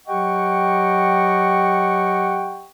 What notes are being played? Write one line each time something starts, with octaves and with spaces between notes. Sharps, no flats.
F#3 G4 D#5 F#5 G5 C#6